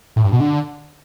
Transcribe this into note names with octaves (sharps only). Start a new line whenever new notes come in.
A2
G2
B2
D3